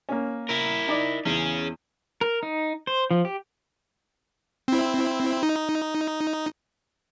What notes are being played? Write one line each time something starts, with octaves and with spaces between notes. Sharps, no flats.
A#3 C#4
E4 A#4
D#4 D5 D6
E2 C#4 G#4
A#4
D#4
C5
F3
G4
C4 E4
D#4